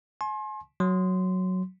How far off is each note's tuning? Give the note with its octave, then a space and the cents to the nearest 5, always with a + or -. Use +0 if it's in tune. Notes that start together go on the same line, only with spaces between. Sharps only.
G#5 +40 C6 +35
F#3 +0 C6 -15